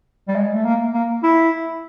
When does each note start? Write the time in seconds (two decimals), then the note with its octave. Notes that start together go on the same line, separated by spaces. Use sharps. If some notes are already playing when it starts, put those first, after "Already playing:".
0.28 G3
0.36 G#3
0.53 A3
0.65 A#3
0.94 A#3
1.23 E4